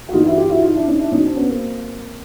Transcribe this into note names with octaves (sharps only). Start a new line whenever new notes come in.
F#4
G1 G2 E3 D#4 F4
E4 F#4
F4 G4
E4 F#4
D#4 F4
D4 E4
C#4 D#4
D4 E4
B1 B2 F#3 C#4 D#4
C4 D4
B3 C#4
A#3 C4